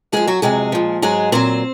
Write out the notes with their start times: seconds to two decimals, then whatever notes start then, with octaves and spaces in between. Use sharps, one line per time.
0.12 F#2 F3 G#3 G#4
0.27 F#3 F#4
0.42 F2 C3 F#3 G#3 G#4
0.72 A#2 F3
1.02 G#2 F#3 G#3 G#4
1.32 A#2 F#3 C4 C5